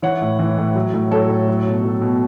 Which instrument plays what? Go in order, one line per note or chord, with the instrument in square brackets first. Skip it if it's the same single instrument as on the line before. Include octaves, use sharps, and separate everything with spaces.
[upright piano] E3 C#5 F#5
A2
E3
A2
F#3
A2
F#3 A4 C#5
A2
F#3
B2
F#3
B2